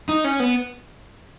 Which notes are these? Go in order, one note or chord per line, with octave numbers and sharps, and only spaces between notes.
D#4
C#4
B3